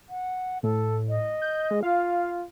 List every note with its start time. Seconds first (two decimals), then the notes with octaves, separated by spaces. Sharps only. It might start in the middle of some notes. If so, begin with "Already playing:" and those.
0.09 F#5
0.63 A2 A4
1.09 D#5
1.42 G6
1.71 G#3
1.83 F4 F5